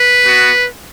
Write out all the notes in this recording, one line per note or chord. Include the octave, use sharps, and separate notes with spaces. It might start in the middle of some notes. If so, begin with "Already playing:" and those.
Already playing: B4
B3 F#4